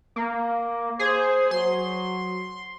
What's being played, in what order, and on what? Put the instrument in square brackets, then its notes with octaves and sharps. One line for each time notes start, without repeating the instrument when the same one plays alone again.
[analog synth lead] A#3
[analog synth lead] G#4 [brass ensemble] C5
[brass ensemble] F#3 [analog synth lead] C6